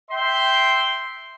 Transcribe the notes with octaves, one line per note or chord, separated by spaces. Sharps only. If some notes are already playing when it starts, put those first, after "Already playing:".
E5 G5 C6